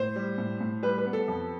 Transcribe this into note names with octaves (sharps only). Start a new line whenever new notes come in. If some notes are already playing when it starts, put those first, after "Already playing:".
Already playing: A2 C5
G3
A2
A2
G3 B4
B4
B3
A4
F2